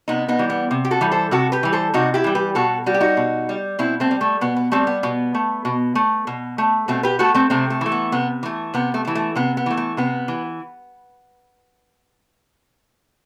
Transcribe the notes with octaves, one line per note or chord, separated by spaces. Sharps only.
C3 B3 D#4
B3 D#4
E3 G3
B3
C3
G4
F#4 A4
E3 G3
A4 C5
C3 F#4 A4
G4 B4
E3 G3
A4 C5
C3 D#4 F#4
E4 G4
E3 G3
G4 B4
B2 F#4 A4
G3 F#4
G4
D#4 F#4
B2
G3
B2 C4 E4
A3 C4
G3
A3
B2 B3
B3
G3 A3 C4
B3
B2 B3
A3
B2
A3
B2
A3
B2 A3 C4
G4 B4
A3 F#4 A4
A3 C4
C3 A3 C4
A3
E3 A3
B3
C3 B3
E3 A3
C3 B3
A3
A3
E3
A3
C3 B3
B3
E3 A3
A3
C3 B3
E3